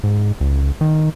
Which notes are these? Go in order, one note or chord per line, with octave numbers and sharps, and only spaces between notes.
G#2
C#2
D#3